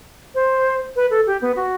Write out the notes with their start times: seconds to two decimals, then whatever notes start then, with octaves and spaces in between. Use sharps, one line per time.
0.35 C5
0.96 B4
1.11 A4
1.27 G4
1.42 B3
1.56 F#4